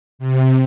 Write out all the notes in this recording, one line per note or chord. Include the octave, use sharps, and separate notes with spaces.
C3